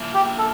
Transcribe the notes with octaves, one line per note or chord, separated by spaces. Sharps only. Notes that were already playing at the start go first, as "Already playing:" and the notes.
Already playing: F3 A#3 E4
G4
A4